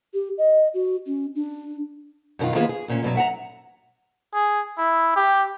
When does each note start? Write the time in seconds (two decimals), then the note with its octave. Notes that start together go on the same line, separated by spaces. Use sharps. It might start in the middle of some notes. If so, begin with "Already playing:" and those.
0.14 G4
0.38 D#5
0.74 F#4
1.07 C#4
1.35 D4
2.39 F#2 B2 D#3 D#4 F4
2.55 D#3 A#3 B3 F4 G#4 B4
2.69 G#4
2.88 D2 A#2 C#4
3.02 G2 B2 F#3
3.16 E5 F#5 G5 A#5
4.34 G#4
4.78 E4
5.16 G4